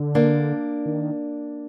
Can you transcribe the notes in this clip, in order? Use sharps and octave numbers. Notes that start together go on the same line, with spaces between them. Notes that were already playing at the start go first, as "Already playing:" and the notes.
Already playing: D3
A#3 D4
D#3